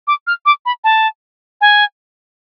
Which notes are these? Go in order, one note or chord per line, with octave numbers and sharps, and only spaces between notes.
D6
F6
D6
B5
A5
G#5